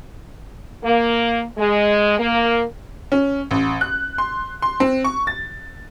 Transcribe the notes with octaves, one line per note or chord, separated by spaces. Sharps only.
A#3
G#3
A#3
C#4
A1
F#6
C6
C6
C4
C#6
A6